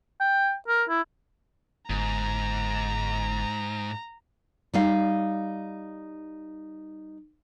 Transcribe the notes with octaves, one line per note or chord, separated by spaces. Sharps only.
G5
A#4
E4
G1 G#2 A#5
G3 D#4 F5